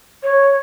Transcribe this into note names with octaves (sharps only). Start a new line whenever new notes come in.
C#5